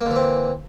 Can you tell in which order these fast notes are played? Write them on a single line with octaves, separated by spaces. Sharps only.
A#3 D3 E3 C4